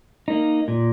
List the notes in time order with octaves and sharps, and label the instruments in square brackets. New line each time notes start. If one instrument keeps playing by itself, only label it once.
[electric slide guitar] A#3 D#4
A#2